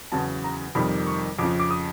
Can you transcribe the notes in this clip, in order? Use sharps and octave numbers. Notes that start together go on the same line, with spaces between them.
E2 C#3 F#3 A5
A#5
F2 C3 D#3 G3 B5
C#6
F2 C#3 F3 D6
D6
D#6